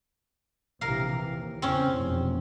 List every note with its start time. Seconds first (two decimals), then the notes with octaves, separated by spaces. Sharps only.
0.81 A#1 C3 E3 A#4 F5
1.18 D#2
1.62 E2 C#3 C4 C#4
1.93 F1 E2 B2